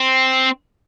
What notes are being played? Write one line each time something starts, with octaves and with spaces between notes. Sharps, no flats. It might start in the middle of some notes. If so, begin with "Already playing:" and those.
Already playing: C4